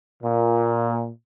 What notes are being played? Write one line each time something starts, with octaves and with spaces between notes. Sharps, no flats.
A#2